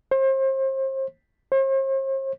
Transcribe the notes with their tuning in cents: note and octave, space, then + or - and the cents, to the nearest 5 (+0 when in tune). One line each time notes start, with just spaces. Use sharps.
C5 +35
C5 +45